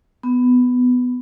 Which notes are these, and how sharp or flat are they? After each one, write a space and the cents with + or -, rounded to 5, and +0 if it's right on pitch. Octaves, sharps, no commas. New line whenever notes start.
B3 +10